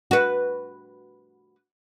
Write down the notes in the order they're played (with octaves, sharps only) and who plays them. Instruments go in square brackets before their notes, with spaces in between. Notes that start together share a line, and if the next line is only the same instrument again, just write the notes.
[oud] F#4 B4